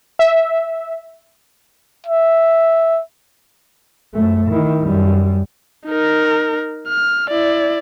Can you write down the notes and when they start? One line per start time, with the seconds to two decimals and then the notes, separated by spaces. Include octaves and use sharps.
0.19 E5
2.07 E5
4.14 F#2 A3
4.50 D#3 E4
4.82 F#2 G3
5.86 D#4 A#4
6.88 F6
7.30 E4 D5